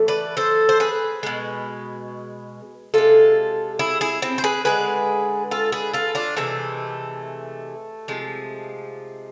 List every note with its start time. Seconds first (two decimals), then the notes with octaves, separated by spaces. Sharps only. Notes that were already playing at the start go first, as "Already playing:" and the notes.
Already playing: A2 E3 A3
0.08 B4 D5
0.37 A4 C5
0.69 C5
0.80 G#4 B4
1.23 B2 G#3
2.94 C3 G#3 F4 A4
3.79 E4 G#4
4.01 E4 G#4
4.22 C4 E4
4.38 C5
4.44 G#4 B4
4.65 D3 G#3 G#4 B4
5.51 F4 A4
5.72 G#4 B4
5.93 F4 A4
6.15 D4 F4
6.36 C3 E3 G#3 A3
8.08 C3 F3 G#3